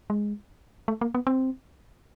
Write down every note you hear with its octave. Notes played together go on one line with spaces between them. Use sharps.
G#3
A3
A#3
B3
C4